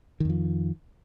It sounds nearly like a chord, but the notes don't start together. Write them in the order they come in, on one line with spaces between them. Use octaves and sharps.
D#3 F2 F3